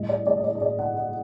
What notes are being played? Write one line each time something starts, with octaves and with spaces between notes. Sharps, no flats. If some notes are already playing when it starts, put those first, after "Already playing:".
Already playing: A2 G3 D#5
D5
D5
D#5
D5
D#5
D5
F#5
D#5